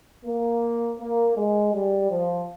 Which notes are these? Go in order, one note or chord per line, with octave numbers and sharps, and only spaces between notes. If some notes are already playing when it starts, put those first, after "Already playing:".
A#3
A#3
G#3
G3
F3